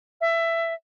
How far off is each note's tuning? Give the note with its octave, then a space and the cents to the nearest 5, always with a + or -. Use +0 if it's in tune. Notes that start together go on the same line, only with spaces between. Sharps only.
E5 +15